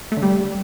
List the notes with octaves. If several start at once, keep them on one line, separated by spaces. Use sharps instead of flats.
A3
D3
G3